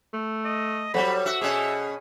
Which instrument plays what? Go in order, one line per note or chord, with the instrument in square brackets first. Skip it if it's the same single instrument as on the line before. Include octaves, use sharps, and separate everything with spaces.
[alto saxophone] A3
[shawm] D#5
[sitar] F#3 G3 [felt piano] A4 C5 F#5 [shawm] B5
[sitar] F#4 [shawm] E5
[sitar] B2 C#4 [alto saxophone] G#4